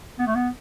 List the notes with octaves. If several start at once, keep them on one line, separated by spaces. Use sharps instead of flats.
B3
A3
B3